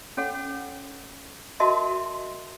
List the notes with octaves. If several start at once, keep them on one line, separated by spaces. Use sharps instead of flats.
C#4 A4 C#5 F#5
F#4 A#4 D#5 E5 A5 C6